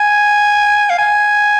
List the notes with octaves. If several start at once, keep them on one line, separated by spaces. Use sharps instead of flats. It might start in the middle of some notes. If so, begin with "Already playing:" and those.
Already playing: G#5
F5
G#5